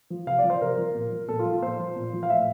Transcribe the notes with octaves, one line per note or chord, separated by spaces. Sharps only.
F3
C3 F5
D5
F3
C5
C3 A#4
F3
A#2
F3
A#2 A4
F4
F3
F4
A#2 C5
F3
A#2
F3
F5
A2 E5